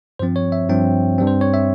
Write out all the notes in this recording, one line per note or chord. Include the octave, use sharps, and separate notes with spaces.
G2 F3 C4 C5
C#5
E5
G2 F3 C4 G5
G2 G3 C4
C5
C#5
E5